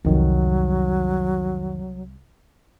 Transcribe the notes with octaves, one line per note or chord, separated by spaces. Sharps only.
C2 F2 D#3 F#3 G3